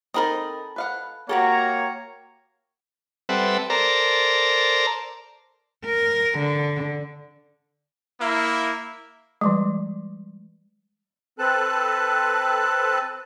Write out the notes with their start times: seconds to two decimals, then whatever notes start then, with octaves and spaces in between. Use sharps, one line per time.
0.14 C4 D#4 A4 A#4 B5 D#6
0.76 B4 F5 F#5
1.29 A#3 F#4 G4 A4 C#5 A#5
3.29 G3 C4 A4 B4 E5 F#5
3.70 A4 A#4 C5 D5 A#5
5.85 A#4
6.39 D3
8.20 A#3 E4
9.41 E3 G3 G#3
11.39 C4 A4 B4 A5 F#6